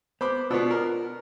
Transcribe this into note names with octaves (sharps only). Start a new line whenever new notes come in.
B3 C5 B5 D6
B2 B3 D4 F4
A#4